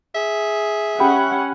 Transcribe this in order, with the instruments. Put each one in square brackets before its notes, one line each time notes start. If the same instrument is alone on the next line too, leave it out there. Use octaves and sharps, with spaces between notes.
[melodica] G#4 [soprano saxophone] E5
[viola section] C#4 F#5 [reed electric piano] G4 G5 B5